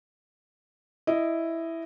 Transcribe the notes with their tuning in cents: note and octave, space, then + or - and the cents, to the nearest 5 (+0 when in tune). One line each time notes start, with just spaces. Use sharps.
E4 +0 D#5 -5